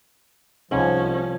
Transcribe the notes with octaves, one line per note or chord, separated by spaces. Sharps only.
C2 G#2 F3 C#4